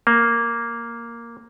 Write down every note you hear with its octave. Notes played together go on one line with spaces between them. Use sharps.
A#3